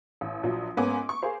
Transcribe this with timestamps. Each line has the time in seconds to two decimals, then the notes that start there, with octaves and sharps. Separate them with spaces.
0.21 A1
0.43 A#1 F3 F#3
0.77 G#2 A#3 B3 C#4 G#5 D6
1.09 C#6
1.22 G#4 A#4 C5 F5